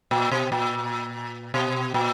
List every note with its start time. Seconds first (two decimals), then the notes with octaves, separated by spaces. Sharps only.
0.11 A#2
0.31 B2
0.52 A#2
1.54 B2
1.94 A#2